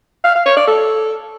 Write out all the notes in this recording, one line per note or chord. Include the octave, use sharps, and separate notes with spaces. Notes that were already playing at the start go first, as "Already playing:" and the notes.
F5
F5
C#5
D5
A4